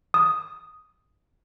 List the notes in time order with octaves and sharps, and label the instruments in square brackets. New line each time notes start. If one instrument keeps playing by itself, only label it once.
[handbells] D#6